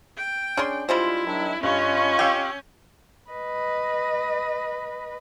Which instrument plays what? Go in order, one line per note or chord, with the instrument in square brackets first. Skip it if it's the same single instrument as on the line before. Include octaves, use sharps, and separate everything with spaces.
[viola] G5
[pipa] C#4 G#4 C6 [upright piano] D4
[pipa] G3 G#3 C5 [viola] E4 [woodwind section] F4
[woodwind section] D#3 F#3 D4
[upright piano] G2 [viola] C#4 [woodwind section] F4 D#5 C#6
[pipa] G4 [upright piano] F5 E6 G6
[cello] B4 D#5